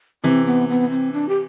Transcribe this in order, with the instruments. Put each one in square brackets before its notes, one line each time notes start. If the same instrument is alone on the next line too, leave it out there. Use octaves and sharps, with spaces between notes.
[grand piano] C3 E3 [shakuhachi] C4
[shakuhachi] B3
B3
C4
D4
G4